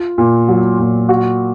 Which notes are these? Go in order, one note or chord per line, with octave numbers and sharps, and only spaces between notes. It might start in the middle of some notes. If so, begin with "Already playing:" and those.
Already playing: F4
A#2
F#3
A#2
F#4